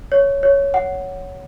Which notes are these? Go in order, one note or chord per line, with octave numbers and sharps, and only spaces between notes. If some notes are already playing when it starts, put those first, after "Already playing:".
C#5
C#5
F#5